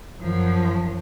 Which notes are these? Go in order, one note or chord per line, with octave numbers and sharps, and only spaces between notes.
F#2 F3